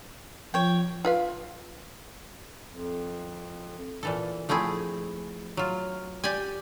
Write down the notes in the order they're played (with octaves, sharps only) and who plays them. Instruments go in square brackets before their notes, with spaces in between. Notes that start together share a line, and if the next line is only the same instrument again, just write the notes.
[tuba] F3 [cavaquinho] C#5 G5
[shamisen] F4 B4 F5
[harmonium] F2
[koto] A#2 E3 A4
F3 A3 C4 E4 G#4
F#3 F4
G4 D5 G5 G#5